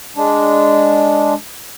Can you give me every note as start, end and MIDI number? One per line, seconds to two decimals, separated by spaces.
0.16 1.34 56
0.16 1.34 62